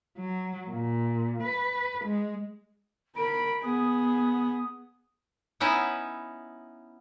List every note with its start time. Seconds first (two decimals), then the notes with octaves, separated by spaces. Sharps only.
0.17 F#3
0.71 A#2
1.43 B4
2.05 G#3
3.16 A#4 B5 D7
3.62 B3 G#4 D#6
5.60 B3 C#4 D#4 E4 E5